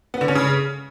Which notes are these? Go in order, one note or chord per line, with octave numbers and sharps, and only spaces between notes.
B3
D3
C#4
C#3